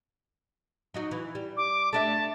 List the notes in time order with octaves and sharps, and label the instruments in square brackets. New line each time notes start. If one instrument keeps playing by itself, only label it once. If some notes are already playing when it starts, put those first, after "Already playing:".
[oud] F#3 D#4 F#4
E3
G3
[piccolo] D6
[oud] A3 D4 E5 [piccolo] A5